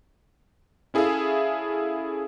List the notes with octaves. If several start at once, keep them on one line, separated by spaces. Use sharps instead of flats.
C#4 E4 G#4 A4 E5 F5